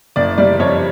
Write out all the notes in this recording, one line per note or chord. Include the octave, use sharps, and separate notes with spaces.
F#1 D5
G3 D5
F2 C#5